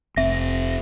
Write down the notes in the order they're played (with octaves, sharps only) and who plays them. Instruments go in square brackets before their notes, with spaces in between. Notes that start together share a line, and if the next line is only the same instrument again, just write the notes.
[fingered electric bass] F1 C4 [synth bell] E5 A#6